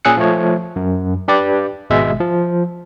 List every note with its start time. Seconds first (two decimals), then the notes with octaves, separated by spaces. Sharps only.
0.05 A#2 C#4 G#4 E6 F#6 C#7
0.17 F3 A3 C#5
0.76 F#2
1.28 D4 G4 B4 D5
1.90 G#1 B2 G#3 E5
2.20 F3